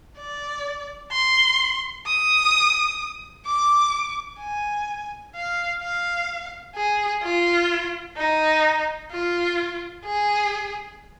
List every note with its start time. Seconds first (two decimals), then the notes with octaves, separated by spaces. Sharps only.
0.18 D5
1.12 C6
2.06 D#6
3.47 D6
4.41 G#5
5.36 F5
5.82 F5
6.76 G#4
7.23 F4
8.17 D#4
9.12 F4
10.05 G#4